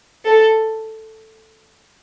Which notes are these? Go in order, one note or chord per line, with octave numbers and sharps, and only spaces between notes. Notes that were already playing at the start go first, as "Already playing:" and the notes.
A4